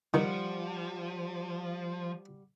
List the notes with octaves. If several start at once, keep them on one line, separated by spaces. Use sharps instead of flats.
D#3 F3 G3 F#5